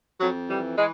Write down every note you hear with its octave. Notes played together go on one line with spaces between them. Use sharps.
F2 F#3
E3 G3
E3 G#3